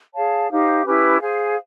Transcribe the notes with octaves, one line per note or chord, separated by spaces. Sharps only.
G#4 C#5 F5 A5
D#4 G4 C5 F5
C#4 E4 G4 B4
G#4 C5 F5 G#5